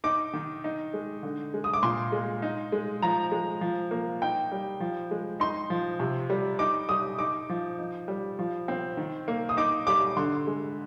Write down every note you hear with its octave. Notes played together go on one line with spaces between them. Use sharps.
D#4 D6
D#3
D#4
G#3
D3
G#3
D#6
D6
A#2 C6
G#3
D#4
G#3
F3 A#5
G#3
F3
A#3
D#4 G5
G3
F3
G#3
D#4 C6
F3
C3
G3
D#4 D6
G3 D#6
D#4 D6
F3
D#4
G3
F3
C4
D#3
A#3
D#6
D#4 D6
G3 D6
D3 C6
G#3